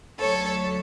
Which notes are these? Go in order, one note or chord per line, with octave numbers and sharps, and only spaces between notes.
D2 D3 F#3 A3 A4 C#5